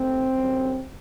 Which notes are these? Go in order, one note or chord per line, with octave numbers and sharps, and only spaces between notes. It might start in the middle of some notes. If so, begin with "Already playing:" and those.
Already playing: D#2 A3 C4
F#2 D3 G3